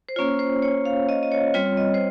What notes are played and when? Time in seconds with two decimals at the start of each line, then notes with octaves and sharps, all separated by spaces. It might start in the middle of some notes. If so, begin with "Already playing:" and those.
0.09 C5
0.16 A#3 C#4 F4 C#5
0.39 C5
0.62 C#5
0.85 F5
1.09 D#5
1.23 D#5
1.31 C#5
1.54 G3 C4 F4 C#5
1.77 D#5
1.94 C5